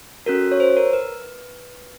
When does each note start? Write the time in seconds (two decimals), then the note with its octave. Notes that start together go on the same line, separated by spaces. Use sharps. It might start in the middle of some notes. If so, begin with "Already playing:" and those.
0.26 C#4 F#4 A4 A#4
0.52 C#5
0.60 C5
0.77 A#4
0.93 B4